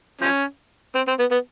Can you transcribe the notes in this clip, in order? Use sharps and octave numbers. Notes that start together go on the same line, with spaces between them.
F3 C#4
C4
C4
B3
B3